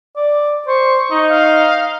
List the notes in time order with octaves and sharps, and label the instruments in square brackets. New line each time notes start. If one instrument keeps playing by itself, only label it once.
[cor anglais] D5
[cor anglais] C5 [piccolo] C#6
[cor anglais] D#4
[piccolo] F5